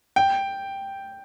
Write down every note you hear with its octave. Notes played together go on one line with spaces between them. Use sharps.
G5